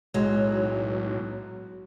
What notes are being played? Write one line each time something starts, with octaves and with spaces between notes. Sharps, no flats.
B1 A2 F#3 G#3